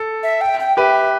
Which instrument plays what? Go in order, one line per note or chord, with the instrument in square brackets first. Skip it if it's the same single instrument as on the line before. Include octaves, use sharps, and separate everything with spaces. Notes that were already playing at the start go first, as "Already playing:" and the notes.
Already playing: [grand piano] A4
[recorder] E5
G5
G5
[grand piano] G4 B4 [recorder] E5